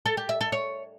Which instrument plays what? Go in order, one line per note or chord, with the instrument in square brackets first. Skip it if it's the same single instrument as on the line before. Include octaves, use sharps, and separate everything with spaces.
[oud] A4
G4
E5
A4
C#5